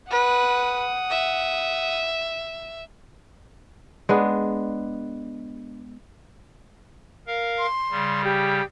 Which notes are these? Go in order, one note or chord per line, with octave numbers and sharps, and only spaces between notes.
B4 F#5 D#6
E5
G#3 B3 D4
A#4 F5
C6
C#3 G3
G4